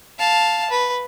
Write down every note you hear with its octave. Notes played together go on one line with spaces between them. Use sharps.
F5 A5
B4